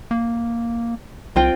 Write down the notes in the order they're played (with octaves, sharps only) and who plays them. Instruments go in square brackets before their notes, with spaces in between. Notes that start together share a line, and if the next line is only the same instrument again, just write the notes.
[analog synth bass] A#3
[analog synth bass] C2 [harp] C4 F4 G5